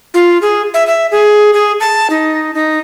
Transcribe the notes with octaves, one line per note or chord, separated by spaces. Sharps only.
F4
G#4
E5
E5
G#4
G#4
A5
D#4
D#4